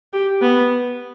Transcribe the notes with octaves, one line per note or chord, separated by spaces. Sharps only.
G4
B3